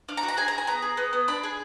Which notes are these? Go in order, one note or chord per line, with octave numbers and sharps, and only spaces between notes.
D4 F5
A#5
F#4
A#5
G#4 G#5
A#5
G#4 G#5
B3 A#5
G#4
B3
B3
D4 B5
G#4